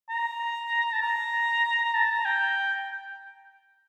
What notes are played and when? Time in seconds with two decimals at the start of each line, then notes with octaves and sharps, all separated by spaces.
0.09 A#5
0.93 A5
1.02 A#5
1.83 A#5
1.94 A5
2.10 A#5
2.25 G5